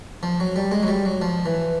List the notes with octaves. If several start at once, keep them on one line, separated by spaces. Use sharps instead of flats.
F3
F#3
G3
G#3
F#3
G3
F#3
F3
E3